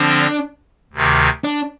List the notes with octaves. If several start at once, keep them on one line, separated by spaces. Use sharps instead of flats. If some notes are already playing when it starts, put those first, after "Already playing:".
Already playing: D3 F3 C4 D4
D2 C3 D#3
D4